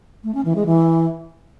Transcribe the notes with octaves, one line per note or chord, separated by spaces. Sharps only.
A3
C#4
E3
G#3
E3